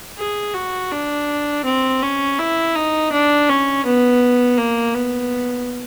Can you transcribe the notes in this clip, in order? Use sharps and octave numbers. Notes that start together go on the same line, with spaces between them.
G#4
F#4
D4
C4
C#4
E4
D#4
D4
C#4
B3
A#3
B3